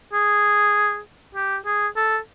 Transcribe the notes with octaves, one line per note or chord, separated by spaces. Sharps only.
G#4
G4
G#4
A4